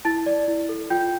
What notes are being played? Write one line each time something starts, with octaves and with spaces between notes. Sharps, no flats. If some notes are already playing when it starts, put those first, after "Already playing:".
E4 A5 A6
D5
E4
A4
F4 G5 G6